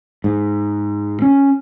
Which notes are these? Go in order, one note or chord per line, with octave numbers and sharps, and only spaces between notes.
G#2
C#4